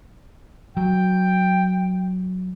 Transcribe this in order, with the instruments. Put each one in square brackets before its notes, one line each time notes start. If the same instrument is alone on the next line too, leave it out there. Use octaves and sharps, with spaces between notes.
[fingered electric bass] F#3 [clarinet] G5